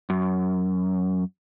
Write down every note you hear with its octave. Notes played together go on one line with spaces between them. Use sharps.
F#2